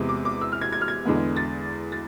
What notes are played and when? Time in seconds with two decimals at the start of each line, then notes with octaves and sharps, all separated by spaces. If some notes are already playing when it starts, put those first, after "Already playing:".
Already playing: E2 C3 G#3 B3
0.09 D6
0.25 D6
0.41 E6
0.52 F6
0.61 G#6
0.72 G#6
0.81 F6
0.88 G#6
1.05 E2 D3 G#3 B3
1.36 A6
1.92 A6